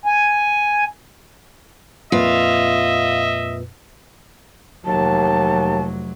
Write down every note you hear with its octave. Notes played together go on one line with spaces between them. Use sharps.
G#5
F2 A#2 F4 B4 D#5 E5
F1 D#2 F#3 A5